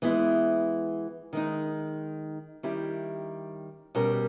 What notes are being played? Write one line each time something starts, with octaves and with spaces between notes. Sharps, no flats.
E3 G#3 B3 E4
D#3 G#3 D#4
D#3 G3 C#4 E4 G4
B2 G3 C#4 G4 A#4